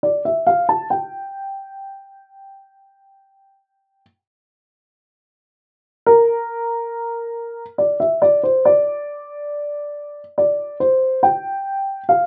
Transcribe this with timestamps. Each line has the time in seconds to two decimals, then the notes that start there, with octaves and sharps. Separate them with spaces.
0.03 D5
0.25 E5
0.47 F5
0.69 A5
0.90 G5
6.06 A#4
7.78 D5
8.00 E5
8.22 D5
8.43 C5
8.65 D5
10.38 D5
10.80 C5
11.23 G5
12.09 F5